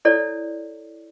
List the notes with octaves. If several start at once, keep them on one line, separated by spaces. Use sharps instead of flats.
E4 A4 C#5 D5